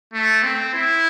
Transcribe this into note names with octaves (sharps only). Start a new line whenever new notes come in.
A3
C4
E4